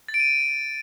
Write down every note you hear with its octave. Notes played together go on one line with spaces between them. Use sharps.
A6
D7
D#7